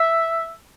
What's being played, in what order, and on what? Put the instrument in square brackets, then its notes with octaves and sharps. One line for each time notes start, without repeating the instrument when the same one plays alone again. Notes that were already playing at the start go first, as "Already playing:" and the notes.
Already playing: [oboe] E5